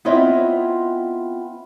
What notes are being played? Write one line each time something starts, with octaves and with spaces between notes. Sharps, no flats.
B3 C4 E4 F4 C#5 D#5